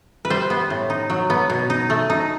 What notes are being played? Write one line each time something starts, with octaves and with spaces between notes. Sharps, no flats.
B4
G3 C5
B3
A2
D#4
F#3
B3
B2
D#4
A3
D#4